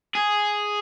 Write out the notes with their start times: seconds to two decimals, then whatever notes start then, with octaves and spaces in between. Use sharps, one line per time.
0.15 G#4